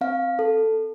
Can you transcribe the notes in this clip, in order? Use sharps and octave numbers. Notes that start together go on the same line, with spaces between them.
C4 F5
A4